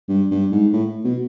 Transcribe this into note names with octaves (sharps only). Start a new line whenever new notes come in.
G2
G2
G#2
A2
B2